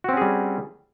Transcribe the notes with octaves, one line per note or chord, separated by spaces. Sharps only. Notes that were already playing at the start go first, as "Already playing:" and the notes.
G3 C4 C#4 F#4 G#4